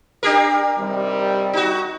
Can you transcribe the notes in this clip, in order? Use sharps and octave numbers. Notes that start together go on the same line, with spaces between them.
D4 G4 A#4
C3 D#3 G3
D#4 F#4